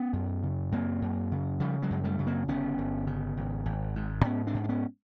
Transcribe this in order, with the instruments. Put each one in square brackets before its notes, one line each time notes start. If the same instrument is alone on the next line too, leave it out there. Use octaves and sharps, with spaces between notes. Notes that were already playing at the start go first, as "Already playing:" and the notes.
Already playing: [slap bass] B3 C#4
F#2
C#3
F#2 A#3 C4
F#2
C#3
C#3 F3 G3
F#3 G#3
F#2
G3 A3
C#3
A#3 C4
G1 B3 C#4
G1
C#3
G#1
G#1
G#2
G#2 B3 C#4
C4 D4
G#2
D4
B3 C#4